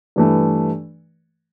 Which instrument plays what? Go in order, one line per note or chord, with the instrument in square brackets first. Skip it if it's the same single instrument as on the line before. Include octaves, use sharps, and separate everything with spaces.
[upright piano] G2 E3 A3